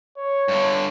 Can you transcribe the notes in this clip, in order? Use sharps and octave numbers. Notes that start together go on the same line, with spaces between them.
C#5
G2 D3